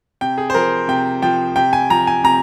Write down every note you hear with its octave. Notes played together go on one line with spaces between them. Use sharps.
C3 G5
G#4
C5
F3 A#4
C3 G5
F3 G5
C3 G5
G#5
F3 A#5
G#5
C3 A#5